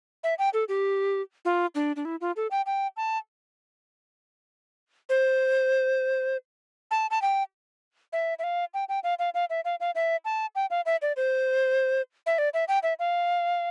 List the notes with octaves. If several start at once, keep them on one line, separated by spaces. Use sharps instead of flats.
E5
G5
A4
G4
F4
D4
D4
E4
F4
A4
G5
G5
A5
C5
A5
A5
G5
E5
E5
F5
G5
G5
F5
F5
F5
E5
F5
F5
E5
A5
G5
F5
E5
D5
C5
E5
D5
E5
G5
E5
F5